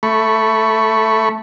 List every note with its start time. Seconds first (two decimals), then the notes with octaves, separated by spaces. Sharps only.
0.03 A3 B5 C#6